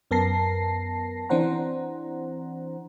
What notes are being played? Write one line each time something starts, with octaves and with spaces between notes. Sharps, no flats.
F#2 B3 A#4 A5 A#6 C7
E3 C4 D4 C5 F#5 A#5